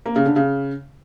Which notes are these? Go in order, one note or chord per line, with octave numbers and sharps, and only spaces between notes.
A#3
C#3
D3
C#3